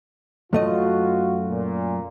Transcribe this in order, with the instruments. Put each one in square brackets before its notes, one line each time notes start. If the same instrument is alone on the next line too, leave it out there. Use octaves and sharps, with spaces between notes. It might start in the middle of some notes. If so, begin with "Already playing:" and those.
[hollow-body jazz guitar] F#2 A3 D#5 [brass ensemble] F4 F#4
[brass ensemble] A#2